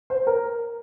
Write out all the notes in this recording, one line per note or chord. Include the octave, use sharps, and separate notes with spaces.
C5
A#4